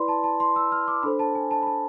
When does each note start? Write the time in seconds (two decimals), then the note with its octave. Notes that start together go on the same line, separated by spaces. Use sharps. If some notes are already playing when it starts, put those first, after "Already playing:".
Already playing: E4 B4 D5 B5 C6
0.08 A5
0.24 A5
0.40 C6
0.56 E6
0.72 F6
0.88 D6
1.03 D4 A4 C5 B5
1.19 A5
1.35 G#5
1.51 A5
1.63 B5
1.67 A5